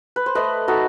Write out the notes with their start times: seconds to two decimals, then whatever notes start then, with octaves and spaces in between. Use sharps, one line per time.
0.16 B4
0.26 C5
0.35 A3 B4 D#5
0.68 D#4 F#4 A4